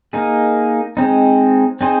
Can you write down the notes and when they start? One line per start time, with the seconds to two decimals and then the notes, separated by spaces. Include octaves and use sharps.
0.13 A#3 D#4 G#4
0.97 G#3 C4 D#4
1.81 C4 D#4 G#4 C5